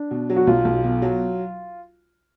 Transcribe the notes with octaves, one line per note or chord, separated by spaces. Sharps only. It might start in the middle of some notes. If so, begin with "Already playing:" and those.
Already playing: D4
B2
F#3
F#4
B1 F4
B1
B2
F#3